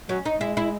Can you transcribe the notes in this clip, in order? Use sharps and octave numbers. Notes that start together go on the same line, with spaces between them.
F#3 C#4
D#4
G#3 E4
E4